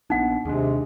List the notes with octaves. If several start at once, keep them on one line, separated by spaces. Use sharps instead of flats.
A#1 B3 D4 D#4 F#5
D#2 C3 G#3 D4